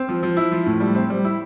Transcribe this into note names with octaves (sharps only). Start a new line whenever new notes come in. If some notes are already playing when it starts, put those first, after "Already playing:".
Already playing: C4
F3
F3
E4
F3
A2
G3
C4
G3
E4